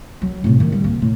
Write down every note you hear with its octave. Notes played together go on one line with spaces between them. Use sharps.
F#3
A2 C3
D#3 E3
G3
A#3
A2